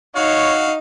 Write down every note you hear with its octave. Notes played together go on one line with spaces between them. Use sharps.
D#4 F#4 C#5 F5